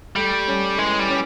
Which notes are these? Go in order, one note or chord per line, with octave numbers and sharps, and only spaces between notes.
G3 A3
C#4
E3 G#3
G3
C#4